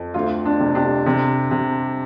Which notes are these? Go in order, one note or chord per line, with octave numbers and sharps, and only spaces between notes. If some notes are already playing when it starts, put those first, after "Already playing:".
Already playing: F2
D2 F4
D4
C3
D4 G4
C3
C3